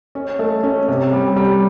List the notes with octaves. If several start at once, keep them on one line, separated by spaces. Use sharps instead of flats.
C#4
A3
C#4
C3
G3
G3